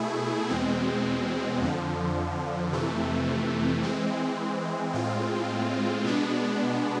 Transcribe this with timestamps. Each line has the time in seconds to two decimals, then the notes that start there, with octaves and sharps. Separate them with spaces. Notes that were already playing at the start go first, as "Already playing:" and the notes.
Already playing: B2 A3 E4 G#4
0.50 E2 B2 G#3 C4
1.62 F2 D3 F3
2.72 F2 C3 E3 A3
3.83 E3 G#3 C4
4.94 A2 G#3 C4 F4
6.05 B2 G#3 B3 D4